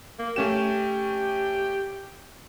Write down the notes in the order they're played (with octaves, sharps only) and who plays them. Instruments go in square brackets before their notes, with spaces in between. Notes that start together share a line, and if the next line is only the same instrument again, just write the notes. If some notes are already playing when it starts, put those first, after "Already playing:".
[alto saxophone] A#3
[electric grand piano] A3 C#4 E7 [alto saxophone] G4